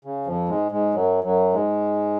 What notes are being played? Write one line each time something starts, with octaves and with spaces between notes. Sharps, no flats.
C#3
F2 F3
G#2 G#3
G#2 G#3
F#2 F#3
F#2 F#3
G#2 G#3